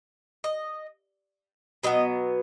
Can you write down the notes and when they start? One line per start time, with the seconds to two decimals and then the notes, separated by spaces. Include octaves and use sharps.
0.44 D#5
1.83 B2 F#3 B3 D#5